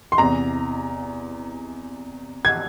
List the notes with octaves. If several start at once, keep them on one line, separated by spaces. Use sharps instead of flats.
C6
E2 C3 E3 A#5
G#6